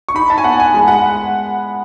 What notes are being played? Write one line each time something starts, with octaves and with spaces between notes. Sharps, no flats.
C#6
D#4 B5
A5
G#5
B3 F#5
G#5
G#3 B5
F#5